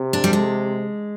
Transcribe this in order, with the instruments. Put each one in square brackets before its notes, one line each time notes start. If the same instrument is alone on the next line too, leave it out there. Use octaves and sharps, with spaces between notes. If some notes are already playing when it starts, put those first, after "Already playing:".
Already playing: [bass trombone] C3
[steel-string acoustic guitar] D4
G3
G#3